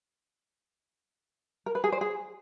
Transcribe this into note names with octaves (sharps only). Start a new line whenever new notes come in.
A#4
B4
G#4
C5
G#4